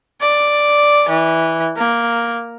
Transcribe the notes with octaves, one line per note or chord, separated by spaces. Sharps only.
D5
E3
A#3